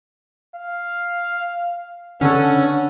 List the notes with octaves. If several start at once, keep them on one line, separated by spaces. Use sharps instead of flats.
F5
D3 B3 C#4 A4 F#5